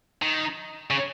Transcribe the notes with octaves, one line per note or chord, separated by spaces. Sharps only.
D#3
C#3